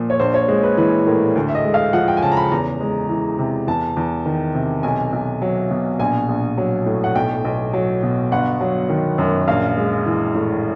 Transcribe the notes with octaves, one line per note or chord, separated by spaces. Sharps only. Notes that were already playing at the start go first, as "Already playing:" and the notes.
Already playing: A#2 F3
C#5
A#1 C5
C#5
G#3 C5
B4
E3 B4
A2 A#4
D2
E5
D#5
G#3
F5
F3 F#5
G5
G#5
C#3 A5
A#5
B5
E2 A#5
G#3
E3
C3
E2 A5
E2
D#3
C3
B1 G#5
B1
F#3
B2
A#1 G#5
A#1
F#3
A2
F#5
B1 G5
B1
F#3
B2
G1 F#5
F#3
D#3
F#2
A#1 F5
G#3
E3
A2